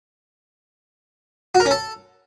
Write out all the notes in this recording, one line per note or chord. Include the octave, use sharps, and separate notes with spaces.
F#4
A#4
C#4
A4